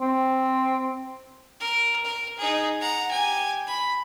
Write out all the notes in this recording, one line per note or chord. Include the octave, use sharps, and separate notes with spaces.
C4
A#4
A#4
D#4 G#4
F#5 A#5
G4 G#5
B5